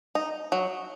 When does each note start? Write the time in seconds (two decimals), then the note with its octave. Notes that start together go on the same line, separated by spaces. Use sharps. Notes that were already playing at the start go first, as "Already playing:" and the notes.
0.15 D#4
0.52 F#3